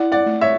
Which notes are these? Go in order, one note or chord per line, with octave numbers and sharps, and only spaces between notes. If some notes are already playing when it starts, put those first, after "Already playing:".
Already playing: E4 D5 F#5
D5 F#5
A3
C#5 E5